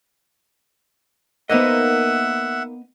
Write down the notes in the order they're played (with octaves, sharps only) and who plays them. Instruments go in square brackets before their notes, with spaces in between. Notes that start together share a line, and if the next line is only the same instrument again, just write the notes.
[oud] A#3 D#4 C5 [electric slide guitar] B3 D#5 [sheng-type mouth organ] E5 F#5